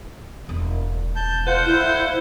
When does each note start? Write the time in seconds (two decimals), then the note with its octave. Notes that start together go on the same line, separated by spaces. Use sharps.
0.49 E1
1.16 A5 G6
1.47 F4 C5 F#5 G6
1.65 E4